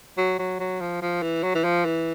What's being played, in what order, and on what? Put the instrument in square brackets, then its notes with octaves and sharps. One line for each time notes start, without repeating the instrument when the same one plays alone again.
[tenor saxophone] F#3
F#3
F#3
F3
F3
E3
F#3
E3
F3
E3